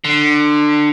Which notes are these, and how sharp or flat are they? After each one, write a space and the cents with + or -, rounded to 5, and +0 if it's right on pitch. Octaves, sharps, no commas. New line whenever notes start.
D3 +20